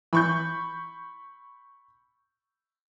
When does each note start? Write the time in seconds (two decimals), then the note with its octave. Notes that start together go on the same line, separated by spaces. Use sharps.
0.13 E3 B5 C#6 G6